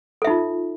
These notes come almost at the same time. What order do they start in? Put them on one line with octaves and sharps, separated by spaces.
A4 E5 D#4 F4